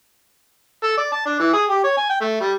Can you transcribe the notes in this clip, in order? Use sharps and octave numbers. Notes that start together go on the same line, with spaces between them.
A4
D5
A5
D4
E3
G#4
G4
C#5
G#5
G5
A3
G3